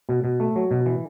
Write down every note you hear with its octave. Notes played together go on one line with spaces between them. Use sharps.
B2
B2
A3
F#3
B2
E3